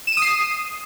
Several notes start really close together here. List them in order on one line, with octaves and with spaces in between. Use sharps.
E7 D#7 D#6 C7